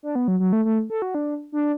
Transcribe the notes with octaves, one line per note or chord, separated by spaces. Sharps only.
D4
B3
F#3
F#3
A3
A3
A4
F#4
D4
D4